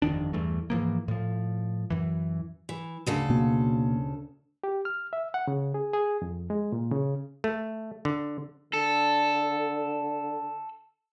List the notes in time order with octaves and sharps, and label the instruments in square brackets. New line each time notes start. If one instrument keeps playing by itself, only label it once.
[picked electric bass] G1 F2 D#3 D4
E2 G2 E3 A3
G#2 E3 F3 A#3
A2 F3
F#2 E3
[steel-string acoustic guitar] E3
D2 C#3 A4
[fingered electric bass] B2 A#3
[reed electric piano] G4
F6
E5
F#5
C#3
G#4
G#4
F2
G#3
A#2
C#3
[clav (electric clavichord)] A3
D3
[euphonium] D3 [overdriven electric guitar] A4